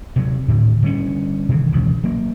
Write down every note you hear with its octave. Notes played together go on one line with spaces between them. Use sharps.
C3 F#3
A2 D3 D#3
D3 G3 C#4
C3 D#3 E3
E1 C#2 E3
F#3 A#3